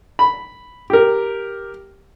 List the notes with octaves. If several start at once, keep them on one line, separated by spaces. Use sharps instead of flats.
B5
G4 A#4